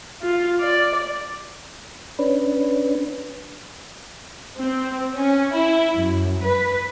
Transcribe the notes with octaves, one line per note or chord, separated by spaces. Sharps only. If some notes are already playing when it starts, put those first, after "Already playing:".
F4
D5
C#4 D4 B4
C4
C#4
E4
F#2
B4